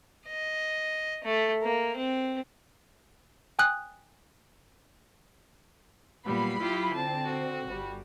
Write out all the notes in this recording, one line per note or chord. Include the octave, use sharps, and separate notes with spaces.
D#5
A3
A#3
C4
G5 G#5 D#6 F#6 G6
A#2 F#3 G3 B3 B5 C7
E4 F4 G4
D3 C4 A5
F#4
G1 G3